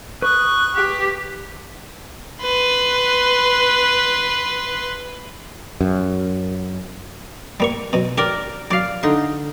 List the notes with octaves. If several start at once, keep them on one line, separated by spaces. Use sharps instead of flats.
B4 C#6 D#6 F#6
G4
B4 C6
F#2
G3 A#3 C#6
B2 F#3
G4 A#4 D5
F#3 D5 F5
D3 D#4